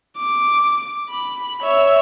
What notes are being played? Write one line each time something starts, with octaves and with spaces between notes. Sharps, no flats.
D6
B5
C#5 E5